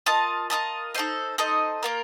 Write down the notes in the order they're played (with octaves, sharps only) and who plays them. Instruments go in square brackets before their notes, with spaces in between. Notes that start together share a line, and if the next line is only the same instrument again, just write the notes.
[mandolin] F4 A#4 D#5 A5
F4 A#4 D#5 A5
D#4 A4 C5 D#5
D#4 A4 C5 D#5
A#3 F4 A#4